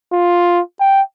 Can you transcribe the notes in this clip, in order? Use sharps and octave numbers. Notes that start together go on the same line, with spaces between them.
F4
G5